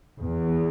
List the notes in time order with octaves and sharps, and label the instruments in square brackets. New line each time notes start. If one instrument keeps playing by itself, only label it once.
[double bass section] E2